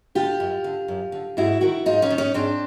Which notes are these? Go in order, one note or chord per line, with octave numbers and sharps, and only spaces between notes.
D3 F4 G4
F#2
D3
F#2
D3
G#2 E4 F#4
D#3 E4 F#4
G#2 D#4 F4
C#4 D#4
D#3
C#4 D#4
G#2 C4 D4